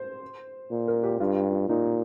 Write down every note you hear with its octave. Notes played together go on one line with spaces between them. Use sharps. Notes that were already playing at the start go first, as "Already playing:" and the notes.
Already playing: C5
A#2
A#4
G4
G2 F4
G4
F4
A#2 D#4